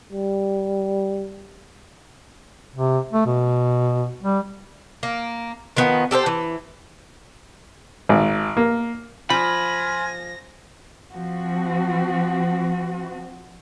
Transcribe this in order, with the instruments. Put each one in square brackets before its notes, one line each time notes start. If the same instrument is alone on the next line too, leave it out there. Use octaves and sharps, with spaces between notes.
[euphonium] G3
[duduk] C3
A3
B2
G3
[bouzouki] A#3
D#3 F3 B3
G4 A4 A#4 C5
E3
[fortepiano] G#1
A#3
[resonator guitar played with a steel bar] F3 [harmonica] F4 G#5 [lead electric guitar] B5 [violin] A#6
[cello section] F3 C4 F#4